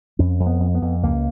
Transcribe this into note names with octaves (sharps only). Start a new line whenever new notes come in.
F2 C#4
F2
B3
F2
B3
F2
C#2 A#3